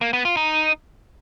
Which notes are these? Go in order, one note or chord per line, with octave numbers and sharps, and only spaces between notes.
A#3
B3
F4
D#4